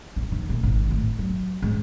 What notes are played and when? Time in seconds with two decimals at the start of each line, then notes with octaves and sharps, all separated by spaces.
0.16 A#1
0.32 D#3
0.49 A#2
0.63 G#1
0.90 A2
1.19 F#3
1.62 G#2